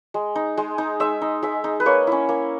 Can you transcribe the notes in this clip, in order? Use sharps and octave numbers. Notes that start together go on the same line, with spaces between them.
G#3
D#4
G#3
D#4
G#3 E5
D#4
G#3 E5
D#4
B4
A#3 C#5
C#4 E4
A#3